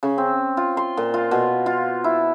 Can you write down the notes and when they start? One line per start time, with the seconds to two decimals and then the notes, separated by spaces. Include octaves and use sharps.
0.03 C#3
0.18 C4
0.57 F4
0.77 C6
0.97 A#2
1.14 F4
1.31 B2
1.66 F4
2.04 E4